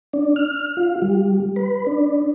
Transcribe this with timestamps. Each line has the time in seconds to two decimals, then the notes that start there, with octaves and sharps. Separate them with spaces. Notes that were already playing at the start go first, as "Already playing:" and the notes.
0.13 D4
0.36 F6
0.77 F4
1.02 G3
1.56 B4
1.87 D4